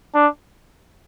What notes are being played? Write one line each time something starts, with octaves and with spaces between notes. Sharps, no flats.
D4